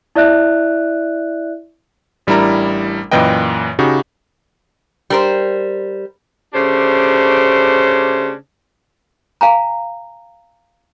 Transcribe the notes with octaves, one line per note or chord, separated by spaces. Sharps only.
E4 D5 E5 F#6
A1 G3 D4 E4 A#4 A#5
F#2 A#2 E3 B4 D#5 G5
C#3 D#4 F#4 G4
G3 A#4 C5
C#3 A3 D4 G4 C5
F5 G#5 A#5